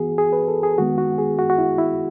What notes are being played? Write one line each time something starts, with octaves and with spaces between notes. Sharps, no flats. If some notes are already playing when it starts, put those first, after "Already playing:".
Already playing: E3 B3 F#4 G#4
G#4
B4
A4
G#4
D#3 G#3 B3 F#4
F#4
G#4
F#4
F#4
E4
E4